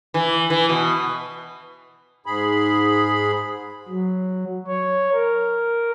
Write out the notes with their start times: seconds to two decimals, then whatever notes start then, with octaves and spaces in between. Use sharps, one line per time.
0.14 E3
0.50 E3
0.69 B2
2.26 G#2 G#4 B5
3.88 F#3
4.67 C#5
5.13 A#4